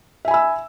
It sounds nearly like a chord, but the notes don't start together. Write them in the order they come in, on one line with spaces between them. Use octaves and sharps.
E5 G#5 B5 E6